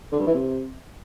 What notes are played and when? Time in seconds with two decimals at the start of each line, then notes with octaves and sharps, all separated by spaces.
0.12 D3
0.19 G2
0.27 E3
0.34 C3